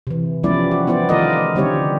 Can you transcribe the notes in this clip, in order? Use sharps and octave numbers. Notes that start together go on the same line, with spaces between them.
C3 E3
F3 G3 B3 C#4 E4 D5
F#4
B3 E4 C5 D5
D#3 A3 F4 A#4 D5 D#5
D3 G3 C4 D#4 G4 C#5